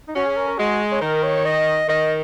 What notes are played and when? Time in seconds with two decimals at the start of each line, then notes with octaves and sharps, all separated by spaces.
0.08 D#4
0.16 C#4 F#4
0.26 G#4
0.37 A#4
0.48 A#4
0.58 G#3 F#4
0.92 C#5
1.02 D#3 A#4
1.23 C#5
1.46 D#5
1.89 D#3 D#5